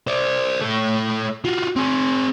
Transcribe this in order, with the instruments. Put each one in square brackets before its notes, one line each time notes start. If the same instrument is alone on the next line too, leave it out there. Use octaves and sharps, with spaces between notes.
[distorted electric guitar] C5 D5
A3 C#5
F4 F#4
C4 G#4